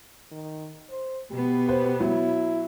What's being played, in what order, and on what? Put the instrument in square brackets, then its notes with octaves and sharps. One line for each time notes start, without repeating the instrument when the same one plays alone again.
[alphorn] D#3
C5
[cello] B2 B3 [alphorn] G4
[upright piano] B4 C5
[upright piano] F#3 [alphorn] E4